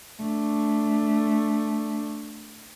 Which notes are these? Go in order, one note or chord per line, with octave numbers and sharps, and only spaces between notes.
A3 D4